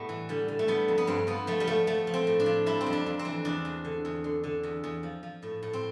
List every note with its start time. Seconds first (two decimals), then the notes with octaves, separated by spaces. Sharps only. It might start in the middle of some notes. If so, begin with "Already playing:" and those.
Already playing: A2 G3 A3 B3
0.09 E3
0.29 D3 G3
0.48 D3
0.59 A3
0.68 G3 B3
0.88 F2
0.98 B3
1.07 G2 C4
1.27 F3 B3
1.47 F3 A3
1.60 G3
1.67 F3 A3
1.87 F3 A3
2.07 F3
2.14 C4
2.27 A2
2.40 D4
2.46 F3
2.66 G3 E4
2.81 C4
2.86 F2
2.93 D4
3.06 F2
3.19 C4
3.25 E3
3.45 E2 D4
3.65 E2
3.85 D3
4.05 E2
4.24 D3
4.44 D3
4.63 E2
4.84 E2
5.03 F3
5.23 F3
5.43 A2
5.63 A2
5.73 C4